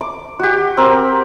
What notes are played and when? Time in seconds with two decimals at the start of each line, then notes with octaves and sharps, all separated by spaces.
0.01 D6
0.39 F#4 G4
0.77 C4 A#4